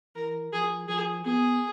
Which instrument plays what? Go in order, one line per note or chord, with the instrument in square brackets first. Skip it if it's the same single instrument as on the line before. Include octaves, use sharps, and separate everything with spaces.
[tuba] E3 [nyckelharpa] A#4
[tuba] F3 [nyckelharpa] G#4
[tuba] F3 [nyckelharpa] G#4
[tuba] B3 [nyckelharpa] G#4